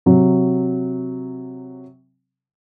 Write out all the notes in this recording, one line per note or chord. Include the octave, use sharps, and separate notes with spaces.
C3 F#3